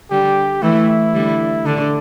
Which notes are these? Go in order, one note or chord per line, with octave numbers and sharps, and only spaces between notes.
D3 G3 G4
E3 A3 E4
D3 G3
D3 D4